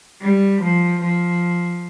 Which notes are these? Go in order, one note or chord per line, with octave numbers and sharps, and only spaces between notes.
G3
F3
F3